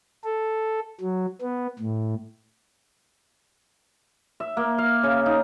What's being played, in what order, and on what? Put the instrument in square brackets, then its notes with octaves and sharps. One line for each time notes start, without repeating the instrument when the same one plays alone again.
[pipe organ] A4
F#3
B3
A2
[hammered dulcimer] E5
A#3
F5
C#3
D#4